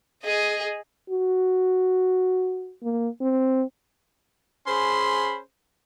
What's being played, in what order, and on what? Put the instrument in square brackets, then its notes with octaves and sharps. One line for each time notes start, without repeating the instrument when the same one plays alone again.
[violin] G#4 D#5
[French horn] F#4
A#3
C4
[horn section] C#4 G#4 C5 B5 C6